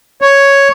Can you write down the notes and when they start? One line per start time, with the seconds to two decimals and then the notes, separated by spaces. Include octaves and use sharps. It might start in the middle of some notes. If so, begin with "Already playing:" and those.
0.22 C#5